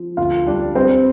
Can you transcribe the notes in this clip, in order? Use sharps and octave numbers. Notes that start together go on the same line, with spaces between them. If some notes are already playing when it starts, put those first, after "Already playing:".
Already playing: F3
D2 F4 F5
G3 D4 D5
G3 C4 C5